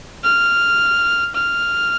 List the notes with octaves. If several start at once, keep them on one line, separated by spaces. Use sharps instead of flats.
F6
F6